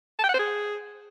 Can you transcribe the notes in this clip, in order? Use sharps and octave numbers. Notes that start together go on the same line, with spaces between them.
A5
G5
F#5
C5
G#4